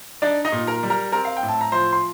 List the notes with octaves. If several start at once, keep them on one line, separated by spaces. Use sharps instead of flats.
D4 D#4 D5
D#4 D#5
A#2
A#4 A#5
G3
A#4 A#5
C4 A#4 A#5
F5
G5
A2
A5
A#5
F3 C5 C6
C6